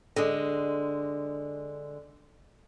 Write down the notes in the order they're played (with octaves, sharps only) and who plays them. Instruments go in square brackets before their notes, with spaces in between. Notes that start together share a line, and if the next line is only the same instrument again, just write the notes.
[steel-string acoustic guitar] D3 G#3